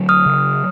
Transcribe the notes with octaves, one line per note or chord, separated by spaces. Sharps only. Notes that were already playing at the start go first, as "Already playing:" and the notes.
Already playing: D3 F#3
D#6 F6
C#3